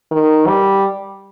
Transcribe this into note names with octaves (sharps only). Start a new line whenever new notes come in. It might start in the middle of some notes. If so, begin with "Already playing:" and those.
D#3
G3